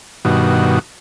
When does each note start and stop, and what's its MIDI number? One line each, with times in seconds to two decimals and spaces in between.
0.25 0.79 43
0.25 0.79 47
0.25 0.79 51
0.25 0.79 66